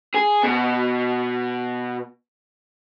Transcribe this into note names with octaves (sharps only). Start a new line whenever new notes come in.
G#4
B2